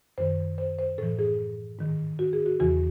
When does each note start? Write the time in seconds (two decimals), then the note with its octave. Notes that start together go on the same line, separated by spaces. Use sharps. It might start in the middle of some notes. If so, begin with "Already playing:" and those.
0.18 F#2 D#3 C5
0.58 C5
0.79 C5
0.98 A2 E3 A4
1.19 G#4
1.79 G#2 D#3
2.19 F#4
2.33 G#4
2.46 F#4
2.60 E2 C#3 E3 F#4